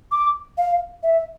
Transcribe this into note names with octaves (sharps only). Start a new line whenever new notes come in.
D6
F5
E5